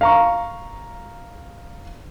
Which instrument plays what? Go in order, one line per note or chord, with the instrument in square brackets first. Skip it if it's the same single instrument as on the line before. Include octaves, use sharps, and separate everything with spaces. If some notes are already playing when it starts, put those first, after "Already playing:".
[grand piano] F5 A#5 C#6